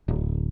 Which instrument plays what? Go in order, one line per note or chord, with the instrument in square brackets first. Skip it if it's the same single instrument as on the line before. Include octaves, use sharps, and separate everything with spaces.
[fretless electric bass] D1